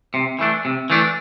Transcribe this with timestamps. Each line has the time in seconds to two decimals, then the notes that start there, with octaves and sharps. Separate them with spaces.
0.14 C3
0.39 E3 A3 D4
0.65 C3
0.90 E3 A3 D4